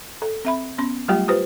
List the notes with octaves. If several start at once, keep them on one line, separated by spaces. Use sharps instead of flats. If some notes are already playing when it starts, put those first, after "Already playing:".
A4
C4 E5 B5
B3 C#4 C6
F#3 G3 A3 F4 G4 G5
F4 G4 B4 C5